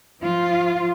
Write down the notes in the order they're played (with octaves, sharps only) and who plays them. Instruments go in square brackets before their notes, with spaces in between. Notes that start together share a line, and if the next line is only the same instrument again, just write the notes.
[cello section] F3 F4